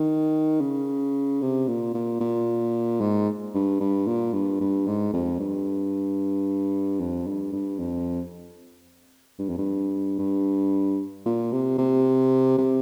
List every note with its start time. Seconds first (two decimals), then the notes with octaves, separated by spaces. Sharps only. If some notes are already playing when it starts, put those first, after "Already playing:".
Already playing: D#3
0.61 C#3
1.42 C3
1.68 A#2
1.94 A#2
2.20 A#2
3.01 G#2
3.54 G2
3.80 G2
4.07 A#2
4.33 G2
4.60 G2
4.87 G#2
5.13 F2
5.39 G2
7.00 F2
7.27 G2
7.52 G2
7.79 F2
9.39 G2
9.49 F2
9.58 G2
10.19 G2
11.26 A#2
11.52 C3
11.78 C3
12.58 C3